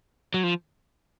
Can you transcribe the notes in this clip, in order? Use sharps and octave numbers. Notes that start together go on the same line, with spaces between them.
F#3
F3